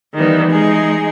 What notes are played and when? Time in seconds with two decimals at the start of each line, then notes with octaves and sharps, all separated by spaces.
0.15 D#3 E3 G3 B3
0.50 E3 G#3 D#4 G#4